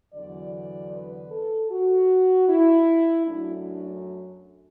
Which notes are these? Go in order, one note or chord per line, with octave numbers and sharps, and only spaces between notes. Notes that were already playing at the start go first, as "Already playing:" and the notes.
E2 D3 F#3 D5
B4
A4
F#4
E4
F#2 F#3 A3 D4